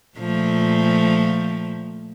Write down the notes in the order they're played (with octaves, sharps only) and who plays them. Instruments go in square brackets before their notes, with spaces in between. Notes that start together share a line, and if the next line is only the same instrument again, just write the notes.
[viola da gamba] A#2 F3 A3